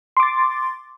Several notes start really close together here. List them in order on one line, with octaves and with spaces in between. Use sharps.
C6 D6 A6